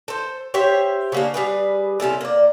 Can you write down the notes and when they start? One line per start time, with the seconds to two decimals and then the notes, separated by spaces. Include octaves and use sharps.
0.08 A4 C5
0.54 G4 C5 C#5 E5
1.12 C#3 A#3 D4
1.34 G3 G#4 B4
2.00 C3 C#4 E4 A4
2.21 A#3 D5